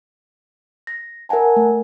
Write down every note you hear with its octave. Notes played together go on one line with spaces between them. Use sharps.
A#6
A#4 E5 F#5 G#5 A5
A3